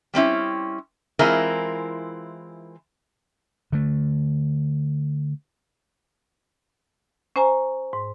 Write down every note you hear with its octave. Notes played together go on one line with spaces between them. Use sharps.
G3 C4 C#4 E4
E3 G#3 C4 E4 F4 A#4
D3 A3
C#4 C5 G#5 A#5
G#2